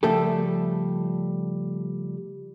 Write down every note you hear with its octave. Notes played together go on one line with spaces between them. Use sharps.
C#3 F3 G3 A3 G#4 A4